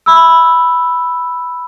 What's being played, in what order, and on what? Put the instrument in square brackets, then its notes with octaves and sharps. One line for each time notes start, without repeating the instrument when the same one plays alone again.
[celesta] B5 E6